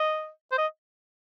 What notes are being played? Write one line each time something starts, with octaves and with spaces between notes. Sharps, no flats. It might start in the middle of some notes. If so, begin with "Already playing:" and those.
Already playing: D#5
C5
D#5